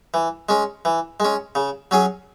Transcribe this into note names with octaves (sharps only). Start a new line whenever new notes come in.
E3
G#3 C#4
E3
G#3 C#4
C#3
F#3 C#4 G#4